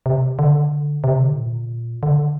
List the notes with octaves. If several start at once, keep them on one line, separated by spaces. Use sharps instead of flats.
C3
D3
C3
D3
A2
A#2
D3